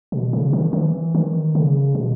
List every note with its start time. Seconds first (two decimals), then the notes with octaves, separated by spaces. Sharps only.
0.12 B2
0.33 C#3
0.53 D#3
0.73 E3
1.15 D#3
1.55 C#3
1.95 B2